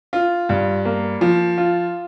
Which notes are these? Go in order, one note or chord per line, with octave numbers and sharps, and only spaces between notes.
F4
G2
A#3
F3
F4